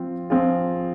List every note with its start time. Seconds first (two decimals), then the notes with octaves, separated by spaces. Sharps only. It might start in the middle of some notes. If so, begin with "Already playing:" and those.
Already playing: F3 C4 F4
0.30 F3 C4 F4 G#4